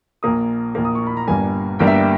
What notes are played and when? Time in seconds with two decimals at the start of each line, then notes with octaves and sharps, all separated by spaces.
0.23 A#1 A#2 A#3 D#6
0.75 A#1 A#2 A#3
0.85 D#6
0.95 C#6
1.07 B5
1.17 A#5
1.27 G1 G2 G3 A#3 G#5
1.79 G1 G2 G3 A#3 G5
1.87 E5
1.95 G5